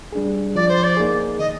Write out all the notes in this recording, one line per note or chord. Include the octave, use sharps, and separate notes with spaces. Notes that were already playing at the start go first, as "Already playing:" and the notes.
G3 D4 G#4
F3 D5
C5
D5
A#3 D#4 G#4
D#3 D#5